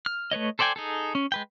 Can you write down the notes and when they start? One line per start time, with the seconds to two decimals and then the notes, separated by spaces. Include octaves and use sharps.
0.06 F6
0.31 A3 B4 C#5 D#5
0.59 A4 C5 D5 G5 G#5
0.76 D#4 G#4 A4
1.15 C#4
1.32 G#3 B4 G5